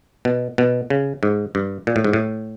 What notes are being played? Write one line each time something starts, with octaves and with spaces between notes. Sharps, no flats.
B2
B2
C#3
G#2
G2
A#2
A2
G#2
A2